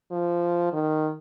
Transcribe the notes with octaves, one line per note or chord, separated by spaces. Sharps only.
F3
D#3